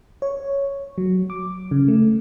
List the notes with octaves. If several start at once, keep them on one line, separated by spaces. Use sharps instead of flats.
C#5
F#3
D6
C#3
A3